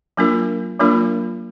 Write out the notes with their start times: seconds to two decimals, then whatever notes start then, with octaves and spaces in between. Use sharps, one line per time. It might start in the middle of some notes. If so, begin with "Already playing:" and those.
0.17 F#3 A#3 D4 F4 A#4
0.80 F#3 A#3 D4 F4 A#4